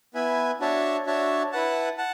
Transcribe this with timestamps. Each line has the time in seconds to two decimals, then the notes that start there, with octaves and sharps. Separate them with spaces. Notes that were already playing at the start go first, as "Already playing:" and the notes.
0.14 B3 E4 B4 E5 G#5
0.60 D4 F#4 C#5 E5 A5
1.06 D4 F#4 C#5 E5 A5
1.52 E4 B4 F#5 A5
1.98 F#5 A5